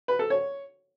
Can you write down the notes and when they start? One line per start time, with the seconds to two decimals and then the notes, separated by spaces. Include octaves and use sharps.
0.08 B4
0.19 A4
0.30 C#5